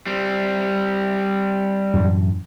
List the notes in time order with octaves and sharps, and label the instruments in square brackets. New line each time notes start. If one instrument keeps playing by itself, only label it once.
[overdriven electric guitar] G3 C4
[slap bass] F#2 A2 E3